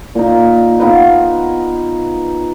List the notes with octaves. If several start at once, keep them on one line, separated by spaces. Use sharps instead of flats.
A#2 D#4
B3 D#4 F4 B4